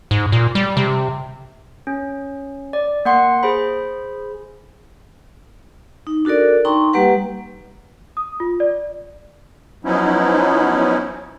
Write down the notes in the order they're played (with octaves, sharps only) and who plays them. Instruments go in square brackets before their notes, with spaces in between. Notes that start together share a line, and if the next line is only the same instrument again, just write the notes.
[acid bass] G#2
A#2
G3
C3
[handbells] C#4
D5
A#3 F#5 C6
G#4 C5 B5
[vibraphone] D#4
D4 F#4 A4 A#4 D5
D#4 G5 A#5 C6 C#6
G3 A#3 G4 B4 F#5
[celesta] D#6
F4
D5
[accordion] F3 F#3 B3 C#4 D#4 E4